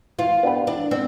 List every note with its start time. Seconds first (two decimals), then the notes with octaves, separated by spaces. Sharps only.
0.19 E3 F4
0.43 B3 D4 G4 B4
0.67 E3 D4
0.91 B3 C4 D4